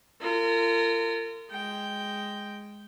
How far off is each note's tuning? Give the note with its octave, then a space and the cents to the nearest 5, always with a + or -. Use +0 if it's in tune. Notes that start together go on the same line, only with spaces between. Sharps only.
F4 -30 A#4 -40
G#3 +0 G5 +0